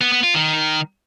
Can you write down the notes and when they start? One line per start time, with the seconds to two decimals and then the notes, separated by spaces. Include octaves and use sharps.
0.01 B3
0.12 B3
0.23 F4
0.34 D#3